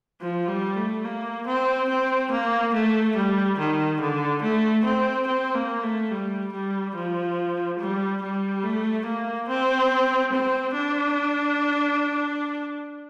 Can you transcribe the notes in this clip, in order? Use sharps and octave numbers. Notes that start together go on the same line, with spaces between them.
F3
G3
A3
A#3
C4
C4
A#3
A3
G3
D#3
D3
A3
C4
C4
A#3
A3
G3
G3
F3
G3
G3
A3
A#3
C4
C4
D4